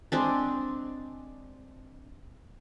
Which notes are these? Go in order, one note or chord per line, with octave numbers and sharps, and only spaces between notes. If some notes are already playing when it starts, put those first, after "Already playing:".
G#3 C4 D4